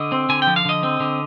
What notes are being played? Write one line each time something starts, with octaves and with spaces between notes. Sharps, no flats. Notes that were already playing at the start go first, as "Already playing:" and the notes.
Already playing: D3 D#5
C4
D3 G#5
G5
F3
F5
D3 D#5
C4
D3